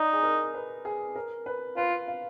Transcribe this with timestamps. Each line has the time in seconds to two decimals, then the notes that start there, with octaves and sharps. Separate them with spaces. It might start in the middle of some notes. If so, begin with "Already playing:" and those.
Already playing: D#4 D5
0.13 G#4
0.23 A#4
0.54 B4
0.85 G#4
1.16 A#4
1.46 B4
1.76 F4 B4
2.08 F5